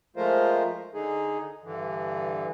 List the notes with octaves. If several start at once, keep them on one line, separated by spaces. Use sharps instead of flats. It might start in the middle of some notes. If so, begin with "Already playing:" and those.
F3 G#3 A3 F4 A#4 C5
D3 D#4 G#4
G2 D3 E3